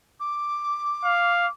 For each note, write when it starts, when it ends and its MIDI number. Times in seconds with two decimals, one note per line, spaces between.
0.19 1.50 86
1.05 1.47 77